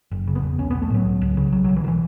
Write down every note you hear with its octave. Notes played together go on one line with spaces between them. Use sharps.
F#1
C#3
B3
E2
B1 C#4
B1 B3
A3
A2 F#3
C#2
C#2
C#3
B1 F#3
B1 F#3
E3
B2 D#3 E3